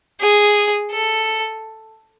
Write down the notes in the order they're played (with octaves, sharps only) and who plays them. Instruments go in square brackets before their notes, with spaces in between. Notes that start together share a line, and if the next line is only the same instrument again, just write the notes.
[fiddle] G#4
A4